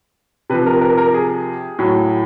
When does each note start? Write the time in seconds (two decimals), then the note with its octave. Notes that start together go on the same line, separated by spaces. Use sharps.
0.50 C3 F3 B4
0.66 A#4
0.78 B4
0.81 A#4
0.97 A#4
1.14 G#4
1.79 A2 F#3